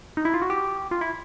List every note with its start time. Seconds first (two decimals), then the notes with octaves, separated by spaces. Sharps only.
0.17 D#4
0.25 E4
0.34 F4
0.42 F#4
0.50 G4
0.91 F4
1.01 E4